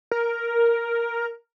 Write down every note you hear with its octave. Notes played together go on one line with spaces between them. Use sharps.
A#4